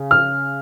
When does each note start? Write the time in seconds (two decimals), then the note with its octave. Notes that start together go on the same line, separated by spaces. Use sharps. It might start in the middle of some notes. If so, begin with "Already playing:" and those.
Already playing: C#3
0.11 F6